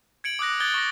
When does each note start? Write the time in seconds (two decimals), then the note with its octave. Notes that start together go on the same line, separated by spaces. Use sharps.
0.24 G#6 C#7 D7 F#7
0.39 D6 D#6 F#6 A#6
0.60 D#6 F#6 G#6 A6 G7
0.74 C#6 A#6